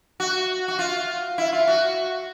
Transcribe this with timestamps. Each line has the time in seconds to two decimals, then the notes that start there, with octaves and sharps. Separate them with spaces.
0.20 F#4
0.68 F#4
0.79 F4
1.38 E4
1.52 F4
1.68 F#4